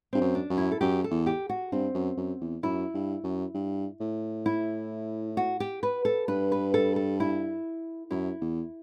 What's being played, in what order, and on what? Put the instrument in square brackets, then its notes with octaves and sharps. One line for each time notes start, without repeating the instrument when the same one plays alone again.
[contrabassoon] G2 [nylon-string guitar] C4
[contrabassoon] F#2
[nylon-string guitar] D4
[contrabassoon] F#2
[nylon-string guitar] E4
A4
[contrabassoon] F#2 [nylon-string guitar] G4
[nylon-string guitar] A4
[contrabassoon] E2
[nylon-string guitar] G4
F#4
[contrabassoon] G2 [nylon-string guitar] C4
[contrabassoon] F#2
F#2
E2
[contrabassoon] F#2 [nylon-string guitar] E4
[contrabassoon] G2
F#2
G2
A2
[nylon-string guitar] E4
F#4
G4
B4
A4
[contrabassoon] G2 [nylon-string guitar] B4
[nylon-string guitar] B4
A4
A4
E4
[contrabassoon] F#2 [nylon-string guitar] E4
[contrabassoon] E2